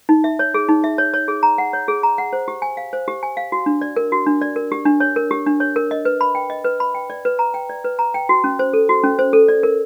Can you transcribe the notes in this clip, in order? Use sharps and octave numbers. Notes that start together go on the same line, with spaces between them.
D#4
E5
C#5
G#4
D#4
E5
C#5
C#5
G#4
A#5
F#5
C#5
G#4
A#5
F#5
C5
G4
G#5
F5
C5
G4
G#5
F5
F#4
D4
D5
A#4
F#4
D4
D5
A#4
G4
D4
C#5
A#4
G4
D4
C#5
A#4
D#5
B4
B5
G5
D#5
B4
B5
G5
D5
B4
A#5
G5
D5
B4
A#5
G5
F#4
C#4
C5
A4
F#4
C#4
C5
A4
D5
A#4